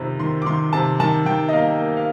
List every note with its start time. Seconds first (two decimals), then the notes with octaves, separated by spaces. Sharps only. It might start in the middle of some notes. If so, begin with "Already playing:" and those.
Already playing: F2 C3 D#3
0.19 D#3 C6
0.42 D6
0.46 D#3 C6
0.73 C3 A5
1.00 D#3 A5
1.26 D#3 G5
1.49 D#5
1.53 A#3 F5
1.80 A#3
1.97 F5